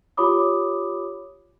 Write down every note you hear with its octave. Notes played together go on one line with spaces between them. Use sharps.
F4 G4 C#5 B5 D6 D#6